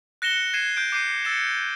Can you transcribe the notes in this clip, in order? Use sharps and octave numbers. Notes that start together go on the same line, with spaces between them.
F#6 A#6 C#7 E7 G7
G#6 C7 D#7 E7
F#6 G6 D7
D6 G6 C7 D#7
E6 A6 C#7 E7